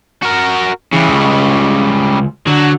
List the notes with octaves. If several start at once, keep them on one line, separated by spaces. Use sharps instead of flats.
F#4 A#4
C#3 E3 G3
C#2
D3 F#3